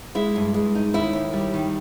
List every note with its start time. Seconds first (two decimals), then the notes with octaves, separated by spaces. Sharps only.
0.15 G#3 E4
0.36 G2
0.54 G#3
0.75 D#4
0.94 D#2 E4
1.13 D#2
1.33 G3
1.54 D#3